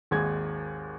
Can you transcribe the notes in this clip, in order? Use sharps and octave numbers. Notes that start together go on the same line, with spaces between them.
G#1 D#2 G#3 G#6